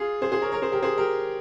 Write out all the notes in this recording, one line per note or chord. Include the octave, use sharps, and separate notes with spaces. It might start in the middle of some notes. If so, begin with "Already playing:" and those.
Already playing: F4 G#4
G#4 C5
G#4 C5
A#4 C#5
A#4 C#5
G#4 C5
G4 A#4
G#4 C5
G4 A#4